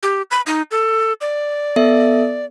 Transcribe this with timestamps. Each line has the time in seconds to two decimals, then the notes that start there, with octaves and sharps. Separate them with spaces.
0.03 G4
0.31 B5
0.47 D#4
0.71 A4
1.21 D5
1.76 B3 A4 E5